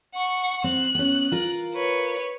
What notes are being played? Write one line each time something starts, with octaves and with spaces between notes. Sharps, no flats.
F#5 C#6
C4 F#6
B3 C#4
F4 A#4
B4 C#5